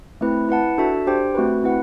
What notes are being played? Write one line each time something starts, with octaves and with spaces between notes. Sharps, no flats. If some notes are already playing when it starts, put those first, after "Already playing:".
A3 C4 E4 B4
E4 B4 F#5 A5
D4 F#4 A4 E5 A5
D4 G4 C5 G5
A3 C4 F#4 B4
C4 E4 B4 F#5